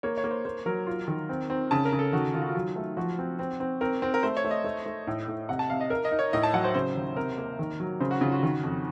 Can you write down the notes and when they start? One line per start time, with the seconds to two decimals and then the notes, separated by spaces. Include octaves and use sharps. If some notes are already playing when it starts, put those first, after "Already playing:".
0.03 A#3 C#5
0.17 C#5
0.24 A#3
0.31 C5
0.45 A#3 C5
0.66 F#3 A#4
0.87 F4
1.08 D#3
1.29 C4
1.50 C4
1.71 C#3 A5
1.85 A#4
1.93 C#3
1.99 A4
2.13 D#3 F#4
2.34 D#3 F4
2.42 F#4
2.49 F4
2.55 F#3
2.76 A3
2.97 F3 F#4
3.19 C4
3.39 C4
3.60 C4
3.81 C4 A#4
4.02 C4
4.14 A#4
4.23 A3 C5
4.37 C#5
4.44 A3
4.51 D#5
4.64 A3
4.86 A3
5.07 A2
5.28 A2
5.49 C3 F#5
5.59 A5
5.70 C3 F5
5.81 D#5
5.90 A#4
6.05 D#5
6.11 D#4
6.19 C#5
6.33 A2 D#5
6.43 A5
6.53 F#3 F#5
6.64 C5
6.74 C#3 C5
6.96 D#2
7.16 C3 A#4
7.38 A#3
7.59 D#3
7.80 F#3
8.00 C#3 C5
8.11 F#4
8.21 C#3 F4
8.32 F#4
8.43 D#3
8.63 F2